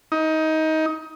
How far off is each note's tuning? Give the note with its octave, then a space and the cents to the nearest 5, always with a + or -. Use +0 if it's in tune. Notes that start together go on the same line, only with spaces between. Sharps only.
D#4 +20